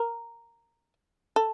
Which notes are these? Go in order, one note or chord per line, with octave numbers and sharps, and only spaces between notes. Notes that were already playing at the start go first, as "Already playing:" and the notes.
Already playing: A#4
A4